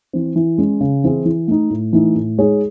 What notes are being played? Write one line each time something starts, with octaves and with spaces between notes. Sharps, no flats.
E3 C4
E3
G#3 C#4
C#3
E3 C4 E4 G#4
E3
A3 D#4
A2
E3 A3 D#4
A2
G#3 D#4 G#4 C#5